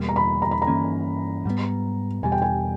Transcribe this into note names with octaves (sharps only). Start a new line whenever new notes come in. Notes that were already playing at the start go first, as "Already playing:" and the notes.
Already playing: E2 B2 G3 A#3
A#5
B5
A#5
B5
A#5
G2 E3 A#3 C#4
G#2 G3 B3
E2 B2 G3 G#5
G5
G#5